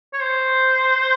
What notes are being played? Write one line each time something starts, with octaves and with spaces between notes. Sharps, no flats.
C#5
C5